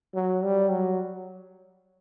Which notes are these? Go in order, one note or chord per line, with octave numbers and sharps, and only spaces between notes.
F#3
G3
F#3